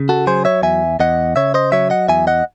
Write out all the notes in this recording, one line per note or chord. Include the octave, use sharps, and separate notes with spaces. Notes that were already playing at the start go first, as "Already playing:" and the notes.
Already playing: C#3
F#4 A4
F#3 G#4 C5
C#5 E5
E2 E5 G#5
E2 D#5 F#5
C#3 C#5 E5
C5 D#5
F#3 C#5 E5
D#5 F#5
E2 E5 G#5
D#5 F#5